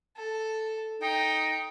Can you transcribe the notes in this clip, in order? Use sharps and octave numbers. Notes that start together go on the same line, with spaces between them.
A4
D#4 G5